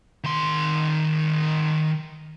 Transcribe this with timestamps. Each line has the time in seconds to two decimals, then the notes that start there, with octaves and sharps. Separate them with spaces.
0.24 D#3 C6